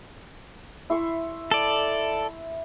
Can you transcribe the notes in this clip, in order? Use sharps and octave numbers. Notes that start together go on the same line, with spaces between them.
E4 C6 C#6
A4 D5